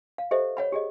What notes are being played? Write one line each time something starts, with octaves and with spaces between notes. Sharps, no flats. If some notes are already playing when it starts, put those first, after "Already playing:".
F5
G4 A4 C5 D#5 E5
C#5 F#5 B5
G4 G#4 D#5